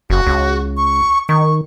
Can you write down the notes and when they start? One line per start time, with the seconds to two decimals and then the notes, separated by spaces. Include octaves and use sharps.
0.10 F#1 F#4
0.27 C#2
0.77 C#6
1.29 D#3 C#6